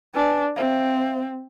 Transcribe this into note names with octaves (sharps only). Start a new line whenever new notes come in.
D4 B4 G#5 A5
C4 C5 E5 F5